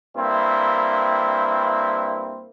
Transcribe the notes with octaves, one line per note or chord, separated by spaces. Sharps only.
G2 A#3 C4 E4